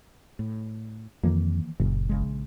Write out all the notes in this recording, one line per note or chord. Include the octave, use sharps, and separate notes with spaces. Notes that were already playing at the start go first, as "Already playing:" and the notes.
A2
F2 D#3 E3 A#3
F#1 A#2 C#3
A#1 C#3 G#3